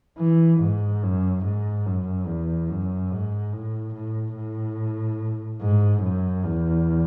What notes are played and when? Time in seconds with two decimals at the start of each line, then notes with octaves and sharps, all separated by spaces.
0.19 E3
0.60 G#2
1.03 F#2
1.45 G#2
1.86 F#2
2.27 E2
2.69 F#2
3.12 G#2
3.53 A2
3.95 A2
4.36 A2
5.61 G#2
6.03 F#2
6.45 E2